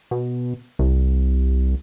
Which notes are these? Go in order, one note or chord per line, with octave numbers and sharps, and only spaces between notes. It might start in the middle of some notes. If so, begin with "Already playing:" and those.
B2
C2